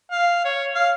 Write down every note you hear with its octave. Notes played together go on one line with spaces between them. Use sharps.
F5
C#5
F5